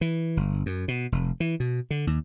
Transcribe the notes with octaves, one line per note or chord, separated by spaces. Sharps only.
E3
G1
F#2
B2
F1
E3
B2
D3
D#2